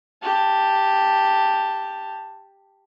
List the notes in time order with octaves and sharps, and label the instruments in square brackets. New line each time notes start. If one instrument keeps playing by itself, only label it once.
[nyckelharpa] G4 A5